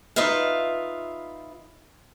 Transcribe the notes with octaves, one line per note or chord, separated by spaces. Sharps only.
D#4 F4 B4 E5 F5